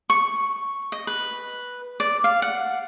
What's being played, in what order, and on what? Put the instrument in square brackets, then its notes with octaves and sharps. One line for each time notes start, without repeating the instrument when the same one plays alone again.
[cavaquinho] C#6
D#5
B4
D5
F5
F#5